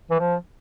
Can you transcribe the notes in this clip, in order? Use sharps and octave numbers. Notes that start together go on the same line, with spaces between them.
E3
F3